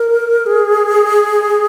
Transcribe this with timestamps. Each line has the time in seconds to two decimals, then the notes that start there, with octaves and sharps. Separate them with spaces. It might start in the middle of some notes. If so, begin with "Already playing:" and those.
Already playing: A#4
0.46 G#4